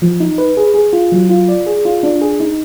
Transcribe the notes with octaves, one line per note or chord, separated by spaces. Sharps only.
F3
D#4
B4
G#4
G#4
F4
F#3
F4
D5
G#4
F4
D4
G#4
D#4